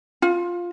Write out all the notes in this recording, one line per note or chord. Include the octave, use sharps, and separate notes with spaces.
F4